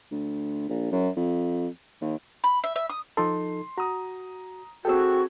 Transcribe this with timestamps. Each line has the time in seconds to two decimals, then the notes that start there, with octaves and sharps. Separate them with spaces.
0.11 D2
0.69 A#1
0.92 F#2
1.16 F2
2.01 D#2
2.44 B5
2.64 E5
2.76 E5
2.90 D#6
3.17 F3 D#4 A4 C6
3.78 F#4 A#5 D#6
4.85 C4 F#4 G#4 A4 G5 E6